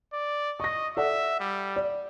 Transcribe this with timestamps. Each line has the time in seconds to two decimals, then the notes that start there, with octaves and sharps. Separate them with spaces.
0.13 D5
0.60 D#5 C#6 A#6
0.97 A4 D5 E5 F#5
1.40 G3
1.76 D5